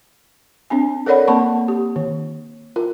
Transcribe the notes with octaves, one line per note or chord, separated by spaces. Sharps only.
C4 D4 G#5
A4 A#4 C#5 D5 F#5 B5
A#3 C4 F#5 A5 B5 C#6
G4
D#3
F4 A#4